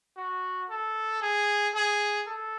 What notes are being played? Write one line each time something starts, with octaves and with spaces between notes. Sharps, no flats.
F#4
A4
G#4
G#4
A4